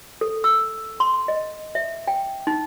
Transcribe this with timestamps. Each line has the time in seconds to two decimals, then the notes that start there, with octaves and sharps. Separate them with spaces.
0.21 A4
0.44 E6
1.00 C6
1.28 D#5
1.75 E5
2.08 G5
2.47 D#4